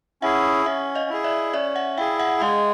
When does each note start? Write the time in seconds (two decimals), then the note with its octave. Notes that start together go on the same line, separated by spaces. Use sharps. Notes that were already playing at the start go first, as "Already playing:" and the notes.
0.22 C#4 E4 G#4 E5 F#5
0.66 C#4 E5 F#5
0.95 D#5 F5
1.10 E4 G#4
1.24 D5 E5
1.53 C#4 D5 E5
1.76 E5 F#5
1.97 E4 G#4 F5 G5
2.19 E5 F#5
2.41 G#3 D#5 F5